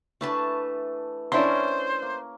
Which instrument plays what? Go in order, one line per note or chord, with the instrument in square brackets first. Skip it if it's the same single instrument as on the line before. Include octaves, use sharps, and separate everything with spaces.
[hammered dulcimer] E3 A3 [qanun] D4 B4 A5
[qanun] C#4 A#4 [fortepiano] D4 E4 C6 [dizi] C5
[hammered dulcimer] A#3